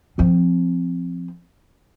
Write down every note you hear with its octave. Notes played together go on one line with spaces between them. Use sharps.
F3 C4